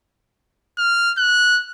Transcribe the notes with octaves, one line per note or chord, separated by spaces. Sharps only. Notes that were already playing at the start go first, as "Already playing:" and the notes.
F6
F#6